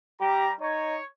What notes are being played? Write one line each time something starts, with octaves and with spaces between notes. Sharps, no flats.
G3 G4 A#5
D#4 C#5